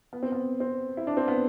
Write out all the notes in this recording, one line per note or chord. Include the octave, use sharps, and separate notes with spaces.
B3
C4
B3
C4
E4
D4
C4
B3